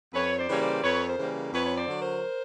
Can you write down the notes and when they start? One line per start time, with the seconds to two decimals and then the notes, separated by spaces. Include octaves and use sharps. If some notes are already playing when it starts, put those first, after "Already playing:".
0.13 F2 B4 C#5
0.37 C5 D5
0.48 C#3 E3 G3 A#3 C#5
0.60 C5 D5
0.83 F2 B4 C#5
1.06 A#4 C5
1.18 C#3 E3 G3 A#3
1.53 F2 B4 C#5
1.64 C#5
1.75 C5 D5
1.87 D3 F#3
1.99 A#4 C5